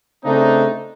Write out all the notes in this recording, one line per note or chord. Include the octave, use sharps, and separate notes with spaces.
C#3 A3 C4 D4 D#4